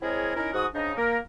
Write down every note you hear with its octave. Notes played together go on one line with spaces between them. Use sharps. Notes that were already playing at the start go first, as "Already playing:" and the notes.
G#3 C4 E4 G#4 A#4 C#5
C#4 D#4 E4 A#4
G#2 F#4 D#6
G#2 C#3 D4 D#4
A#3 A#4